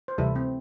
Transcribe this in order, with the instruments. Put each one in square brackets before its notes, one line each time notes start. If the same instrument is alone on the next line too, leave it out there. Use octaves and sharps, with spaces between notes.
[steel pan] C5
[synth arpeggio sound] D2 C3 E3 G3 [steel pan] E4 A4
[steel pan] C4